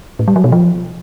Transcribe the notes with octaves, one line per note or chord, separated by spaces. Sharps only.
A2
G3
F#3
B2
F3